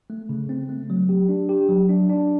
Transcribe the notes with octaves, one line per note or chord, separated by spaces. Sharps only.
A3
C#3
C4
A3
F#3
G4
D4
G4
F#3
D4
D4